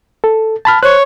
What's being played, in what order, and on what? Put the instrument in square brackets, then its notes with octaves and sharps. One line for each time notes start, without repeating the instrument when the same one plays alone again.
[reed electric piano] A4
A5 B5 F6
[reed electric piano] C5 F#6 [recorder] C#5